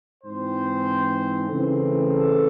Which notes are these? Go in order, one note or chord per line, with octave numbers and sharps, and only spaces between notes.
G#2 E3 C4 C5
C#3 E3 A3 C4
A4